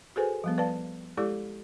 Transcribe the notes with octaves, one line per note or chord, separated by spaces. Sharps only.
F#4 G#4 A4 B4 C5 G#5
F3 G3 B3
B4 D5 F5 A5
G#3 E4 G4 A4 D5 D6